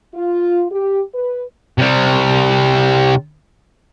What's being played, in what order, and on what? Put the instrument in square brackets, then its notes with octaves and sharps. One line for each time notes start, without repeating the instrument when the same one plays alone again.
[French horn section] F4
G4
B4
[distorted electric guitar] C3 G3